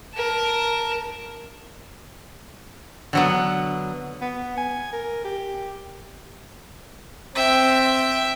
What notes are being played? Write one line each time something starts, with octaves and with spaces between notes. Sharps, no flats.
A#4 A5
D3 F#3 B3
B3
G#5
A#4
G4
C4 E5 G5